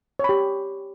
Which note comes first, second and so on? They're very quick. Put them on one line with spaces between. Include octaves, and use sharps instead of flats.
C#5 B5 G4